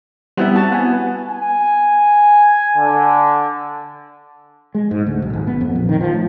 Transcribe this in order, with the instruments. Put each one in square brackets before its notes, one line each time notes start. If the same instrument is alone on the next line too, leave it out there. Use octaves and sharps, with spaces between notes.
[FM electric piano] G3 [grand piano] B3 [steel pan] C4 E4 E5
[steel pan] F#4 A5
[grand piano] B3 [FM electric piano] F#5 G#5
[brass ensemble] G#5
D3
[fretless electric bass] G#3
G#2
D2
B1
G#1
B3
F2
A#1
D#3
F3
A2